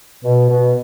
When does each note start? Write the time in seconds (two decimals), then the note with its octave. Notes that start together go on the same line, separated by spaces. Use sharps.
0.24 B2
0.50 B2